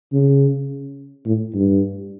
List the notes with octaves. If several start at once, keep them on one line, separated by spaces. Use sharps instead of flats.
C#3
A2
G2